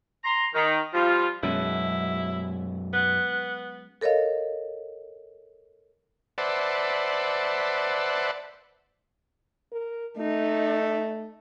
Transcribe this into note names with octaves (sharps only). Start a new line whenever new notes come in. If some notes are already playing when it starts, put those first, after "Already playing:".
A#5 C6
D#3
F3 G3 F4
F#2 B2 F#3 G#3 C#4 E4
B3 F#6
A4 A#4 C#5 D#5 F5
B4 C5 D5 E5 F#5 A5
A#4
A3 D#4